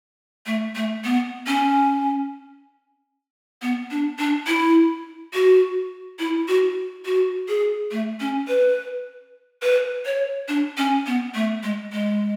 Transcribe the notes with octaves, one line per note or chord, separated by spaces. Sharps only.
A3
A3
B3
C#4
B3
D4
D4
E4
F#4
E4
F#4
F#4
G#4
A3
C#4
B4
B4
C#5
D4
C#4
B3
A3
G#3
G#3